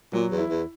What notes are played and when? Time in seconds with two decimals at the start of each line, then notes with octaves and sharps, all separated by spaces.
0.13 A#2 F#3
0.31 E2
0.38 E4
0.50 E2